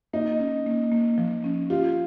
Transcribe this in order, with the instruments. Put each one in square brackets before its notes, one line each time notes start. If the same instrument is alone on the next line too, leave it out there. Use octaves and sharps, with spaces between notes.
[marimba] A#3 [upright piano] D#4
[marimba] C#4
A#3
A#3
F3
C#4
[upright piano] F4 [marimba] G4